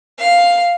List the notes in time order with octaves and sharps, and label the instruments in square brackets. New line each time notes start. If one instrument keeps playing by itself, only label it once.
[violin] F5